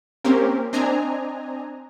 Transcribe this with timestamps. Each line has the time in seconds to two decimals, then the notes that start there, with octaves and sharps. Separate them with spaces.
0.24 A#3 C4 C#4 G4 A#4
0.73 C4 D4 D#5 G#5 A#5